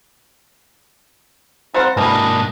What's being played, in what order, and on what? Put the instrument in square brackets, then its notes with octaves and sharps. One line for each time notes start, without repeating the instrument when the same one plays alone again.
[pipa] G3 C4 C5 [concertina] F4 F#5 A#5
[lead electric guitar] G#2 A#3 [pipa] B2 E3 G3 [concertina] D4 D#5